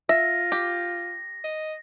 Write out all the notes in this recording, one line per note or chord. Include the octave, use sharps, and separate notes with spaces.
F4 E5 A#6
G4
D#5